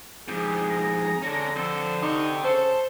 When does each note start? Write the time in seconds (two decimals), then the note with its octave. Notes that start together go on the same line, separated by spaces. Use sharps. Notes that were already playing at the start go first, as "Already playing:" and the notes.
0.28 F2 G#2 G4 G#4
0.70 A#5
1.22 D3 C#4 D4
1.56 F2 A4 C5
2.02 C4 D#4 G4 C#6
2.44 C#3 A4 C5